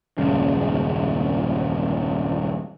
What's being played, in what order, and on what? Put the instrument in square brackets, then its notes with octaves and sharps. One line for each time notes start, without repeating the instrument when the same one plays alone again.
[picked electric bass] D#1 F#2 C#3 G#3